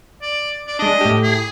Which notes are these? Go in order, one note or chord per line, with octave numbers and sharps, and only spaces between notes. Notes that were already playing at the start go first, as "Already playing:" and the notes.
D5
D5
G#3 D4 D#5
A2 G4
G#4